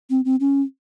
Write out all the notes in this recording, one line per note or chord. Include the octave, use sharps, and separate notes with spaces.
C4
C4
C#4